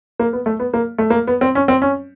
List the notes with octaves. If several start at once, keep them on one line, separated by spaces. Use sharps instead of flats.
A#3
B3
A3
B3
A#3
A3
A#3
B3
C4
C#4
C4
C#4